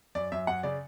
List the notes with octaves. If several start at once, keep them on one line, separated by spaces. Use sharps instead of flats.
F#2 D5
F#2 E5
F#2 F#5
C#3 D5